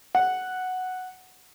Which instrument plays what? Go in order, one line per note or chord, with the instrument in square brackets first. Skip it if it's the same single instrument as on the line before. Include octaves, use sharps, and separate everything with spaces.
[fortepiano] F#5